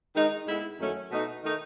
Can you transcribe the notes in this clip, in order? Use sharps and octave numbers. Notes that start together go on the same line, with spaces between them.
D#3 G#3 D#4
A2 G#3 B3 E4
F#2 D#3 F#3 A3 C#4
B2 A3 D#4
D#3 A3 D#4